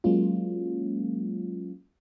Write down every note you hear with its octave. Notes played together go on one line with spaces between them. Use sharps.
F#3 G#3 A#3 C#4 F4